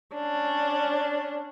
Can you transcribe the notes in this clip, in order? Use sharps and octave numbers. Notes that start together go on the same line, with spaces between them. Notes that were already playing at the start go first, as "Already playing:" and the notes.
C#4 D4